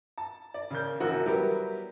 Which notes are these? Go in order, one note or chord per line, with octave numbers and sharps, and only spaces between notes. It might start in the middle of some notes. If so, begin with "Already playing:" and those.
A5
D5
C#3 A#4 G6
E1 A#1 F#4 A#4
F#3 G3 B3 E4 G4 A#4